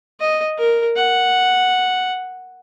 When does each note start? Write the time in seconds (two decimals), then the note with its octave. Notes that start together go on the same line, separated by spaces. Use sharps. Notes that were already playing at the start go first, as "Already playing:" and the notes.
0.21 D#5
0.59 A#4
0.96 F#5